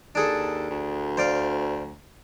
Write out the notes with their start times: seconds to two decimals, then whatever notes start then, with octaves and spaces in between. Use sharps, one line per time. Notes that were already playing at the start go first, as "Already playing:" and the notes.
0.15 D#2 D4 G#4 A4
0.70 D2
1.17 C5 D5 F5